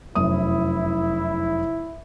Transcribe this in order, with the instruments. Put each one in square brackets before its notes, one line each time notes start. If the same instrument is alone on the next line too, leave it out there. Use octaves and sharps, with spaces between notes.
[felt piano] F1 F#2 D#6 [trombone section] E4